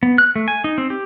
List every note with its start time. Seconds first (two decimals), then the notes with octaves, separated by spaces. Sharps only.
0.03 B3
0.18 F#6
0.36 A3
0.48 G#5
0.64 D#4
0.78 C4
0.90 G4